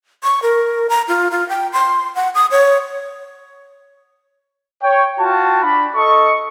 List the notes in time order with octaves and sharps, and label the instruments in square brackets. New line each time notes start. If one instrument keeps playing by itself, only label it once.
[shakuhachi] C#6
A#4
A#5
F4
F4
G5
C6
F#5
D#6
C#5
[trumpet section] C#5 G5
F4 F#4 G5 A5
D4 B5
A4 D#5 C#6